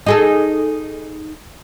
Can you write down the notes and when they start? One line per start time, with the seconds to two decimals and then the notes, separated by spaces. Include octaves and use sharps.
0.06 D#4 G#4 A4